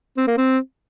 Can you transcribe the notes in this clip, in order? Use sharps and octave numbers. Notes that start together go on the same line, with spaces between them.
C4
A#3
C4